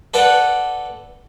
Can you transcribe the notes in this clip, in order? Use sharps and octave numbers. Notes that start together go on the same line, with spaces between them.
A4 B4 D5 F#5 G5